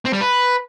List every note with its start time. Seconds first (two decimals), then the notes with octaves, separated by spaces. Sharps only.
0.05 C4
0.13 G3
0.21 B4